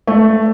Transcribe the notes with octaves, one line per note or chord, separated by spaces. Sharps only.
A3